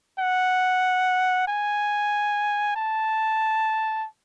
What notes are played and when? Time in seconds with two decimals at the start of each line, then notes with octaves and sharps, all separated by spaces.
0.20 F#5
1.48 G#5
2.76 A5